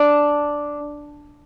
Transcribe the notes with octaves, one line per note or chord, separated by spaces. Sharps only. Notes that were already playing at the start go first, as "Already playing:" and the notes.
Already playing: D4